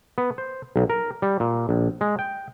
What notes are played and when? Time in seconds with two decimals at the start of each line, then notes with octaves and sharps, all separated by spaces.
0.18 B3
0.38 C5
0.76 B1
0.90 A#4
1.22 G3
1.40 A#2
1.69 A#1
2.01 G#3
2.19 G5